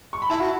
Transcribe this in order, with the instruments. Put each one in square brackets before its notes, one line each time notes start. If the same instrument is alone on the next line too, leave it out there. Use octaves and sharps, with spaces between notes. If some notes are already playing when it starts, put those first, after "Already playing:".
[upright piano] C#6
B5
[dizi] E4 [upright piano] A5
[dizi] F#4